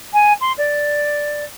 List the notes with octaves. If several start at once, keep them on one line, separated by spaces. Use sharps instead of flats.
G#5
C6
D5